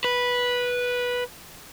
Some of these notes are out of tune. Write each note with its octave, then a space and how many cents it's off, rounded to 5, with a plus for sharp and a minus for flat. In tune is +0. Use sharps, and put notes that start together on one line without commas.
B4 -10